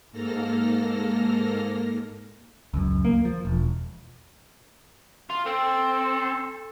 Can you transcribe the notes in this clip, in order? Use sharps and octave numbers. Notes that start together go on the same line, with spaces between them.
G#2 A#3 A4 F6 A#6
C#2 F#2
A#3
F3
E1
F4
C4 A4